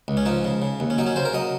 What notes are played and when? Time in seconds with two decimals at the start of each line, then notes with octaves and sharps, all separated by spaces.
0.08 C#2
0.17 C#4
0.26 F3 D#4
0.45 C#3
0.62 C#3
0.80 D#2
0.90 C#4
0.98 F#3 D#4
1.07 C#4
1.16 C#3 C5
1.25 A#4
1.33 F#3 D#5